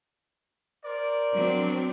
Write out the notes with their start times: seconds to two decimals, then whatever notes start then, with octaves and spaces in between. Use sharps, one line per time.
0.84 A#4 C5 D5
1.34 F#3 C4 D4